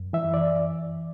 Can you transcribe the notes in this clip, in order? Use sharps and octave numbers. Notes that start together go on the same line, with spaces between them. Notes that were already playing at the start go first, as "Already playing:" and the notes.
Already playing: F#2
E3 E5
D5